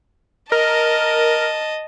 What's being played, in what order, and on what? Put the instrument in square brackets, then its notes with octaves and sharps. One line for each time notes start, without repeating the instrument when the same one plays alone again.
[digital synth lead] A#4 [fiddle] D#5 A5